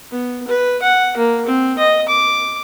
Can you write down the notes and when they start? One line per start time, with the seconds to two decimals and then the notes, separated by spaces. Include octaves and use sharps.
0.11 B3
0.48 B4
0.82 F#5
1.17 A#3
1.46 C4
1.78 D#5
2.09 D6